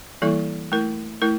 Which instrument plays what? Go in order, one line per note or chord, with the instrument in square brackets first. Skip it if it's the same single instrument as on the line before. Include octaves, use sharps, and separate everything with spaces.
[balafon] E3 G3 A#3 E4 A4
A3 E4 A#4
A3 E4 A#4